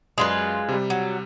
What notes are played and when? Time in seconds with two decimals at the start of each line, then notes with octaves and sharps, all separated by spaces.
0.18 F#2 G#3 F4 B4 D5 D#6
0.69 C3 G3
0.90 F#3